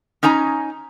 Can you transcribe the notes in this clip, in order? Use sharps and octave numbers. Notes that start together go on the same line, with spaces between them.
C#4 D#4 G#5 A#5